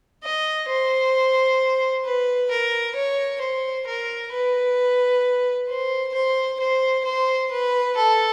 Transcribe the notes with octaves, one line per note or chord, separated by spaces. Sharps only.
D#5
C5
B4
A#4
C#5
C5
A#4
B4
C5
C5
C5
C5
B4
A4